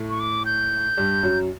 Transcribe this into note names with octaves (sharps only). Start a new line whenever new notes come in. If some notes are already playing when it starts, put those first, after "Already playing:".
Already playing: A2 A3
C#6
D6
G6
G2 G3
F#2 F#3